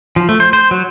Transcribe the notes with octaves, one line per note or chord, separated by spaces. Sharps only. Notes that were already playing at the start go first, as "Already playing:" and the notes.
F3
A3
C5
C5
F#3